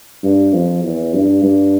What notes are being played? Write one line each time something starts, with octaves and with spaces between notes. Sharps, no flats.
G2
F2
E2
G2
G2